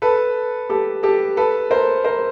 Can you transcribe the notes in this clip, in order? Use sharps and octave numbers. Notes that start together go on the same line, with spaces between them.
A4 B4
G4 A4
G4 A4
A4 B4
A#4 C5
A#4 C5